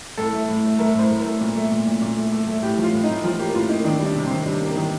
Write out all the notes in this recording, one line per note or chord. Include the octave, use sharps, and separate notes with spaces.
A2 A4
A3
A2
A3
A3 A#4
A2 C5
A2
A#4
A3
A#2
A3
A#2
A#2
A#2
A3
A3
A3
A2 G4
F3
F4
A2
D#4
A2
F3 F4
A#3 G4
A2 F4
A#3 D#4
D#3 D4
G3
D4
C3
D#3 C4
G3 D4
A#3
D#3